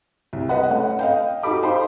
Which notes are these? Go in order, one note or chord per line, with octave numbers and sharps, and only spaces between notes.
C2
B4 D#5 F#5
A3 C#4 F#5
D#5 F5 G5
D#4 F#4 G4 A4 B5 D6
D#4 C5 F5 G5 B5 C6